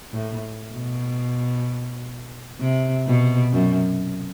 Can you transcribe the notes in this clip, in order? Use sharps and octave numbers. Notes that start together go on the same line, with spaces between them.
A2
B2
C3
B2
F#2